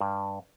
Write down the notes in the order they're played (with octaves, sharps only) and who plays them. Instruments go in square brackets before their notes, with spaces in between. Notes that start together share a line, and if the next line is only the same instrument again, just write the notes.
[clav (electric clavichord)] G2